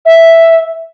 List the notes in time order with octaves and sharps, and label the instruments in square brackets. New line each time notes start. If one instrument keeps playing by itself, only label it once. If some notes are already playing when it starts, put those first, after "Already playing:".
[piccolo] E5